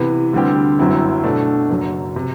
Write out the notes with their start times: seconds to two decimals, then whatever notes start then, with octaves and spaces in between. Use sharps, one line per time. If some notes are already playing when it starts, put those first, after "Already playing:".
Already playing: C3 E3 B3
0.33 D2 D3 G3 C4 G4
0.79 G1 F#2 F#3 C4 E4
1.24 B2 A3 D4
1.70 F#1 F#2 F#3
2.16 C3